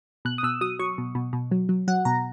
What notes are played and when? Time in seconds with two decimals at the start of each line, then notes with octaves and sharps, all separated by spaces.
0.25 B2 F#6
0.38 D#6
0.43 B2 E6
0.61 F#3 D#6
0.79 F#3 C#6
0.98 B2
1.15 B2
1.33 B2
1.51 F#3
1.69 F#3
1.88 F#3 F#5
2.05 B2 A#5